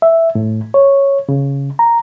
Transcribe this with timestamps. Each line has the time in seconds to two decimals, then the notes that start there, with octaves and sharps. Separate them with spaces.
0.02 E5
0.35 A2
0.74 C#5
1.29 C#3
1.79 A#5